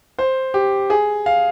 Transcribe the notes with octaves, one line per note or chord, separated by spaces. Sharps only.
C5
G4
G#4
F5